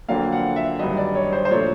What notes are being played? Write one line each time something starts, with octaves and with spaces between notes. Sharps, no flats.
F2 D3 F#3 A#3 F5
F#5
E5
G2 D#3 F#3 D#5
D5
C#5
C5
C5
A#2 F3 A3 D4 C#5